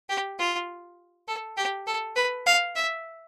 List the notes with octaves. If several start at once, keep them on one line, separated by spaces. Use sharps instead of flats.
G4
F4
A4
G4
A4
B4
F5
E5